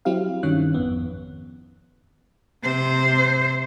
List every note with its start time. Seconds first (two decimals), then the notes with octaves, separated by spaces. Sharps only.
0.05 F#3 C4 E4 G4 F5
0.43 G2 D#3 C#4 C#5 F#6
0.74 G#1 F2 B3
2.63 C3 C5